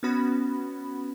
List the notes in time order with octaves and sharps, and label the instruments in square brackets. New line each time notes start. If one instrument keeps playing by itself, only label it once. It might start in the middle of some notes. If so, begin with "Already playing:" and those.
[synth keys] B3 C#4 F#4 B5